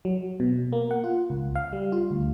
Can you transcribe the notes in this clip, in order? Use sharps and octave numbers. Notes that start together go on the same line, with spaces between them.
F#3
B2
A#3
F#5
F4
C#2
F5
G3
F4
D2